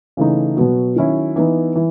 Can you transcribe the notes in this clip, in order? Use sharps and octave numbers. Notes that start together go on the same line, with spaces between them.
C#3 E3 A3 D#4
B2 F#3 B3 F#4
D#3 F#3 C#4 E4
E3 B3 D#4
E3